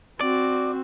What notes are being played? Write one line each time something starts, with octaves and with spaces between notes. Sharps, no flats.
C4 F#4 D5